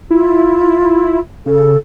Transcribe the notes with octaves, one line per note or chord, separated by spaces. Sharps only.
E4 F4
C#3 A4